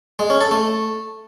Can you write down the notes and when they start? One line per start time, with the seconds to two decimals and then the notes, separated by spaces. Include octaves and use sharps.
0.19 G#3
0.30 C#4
0.41 A4
0.51 A3